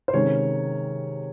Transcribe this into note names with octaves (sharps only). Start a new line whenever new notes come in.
C5
C3 D#3 G#3 C#4 C#5